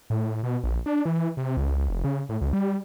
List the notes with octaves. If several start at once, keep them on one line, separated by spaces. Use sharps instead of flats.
A2
B2
A#1
D4
E3
C3
C#2
F1
C#3
A2
C#2
G3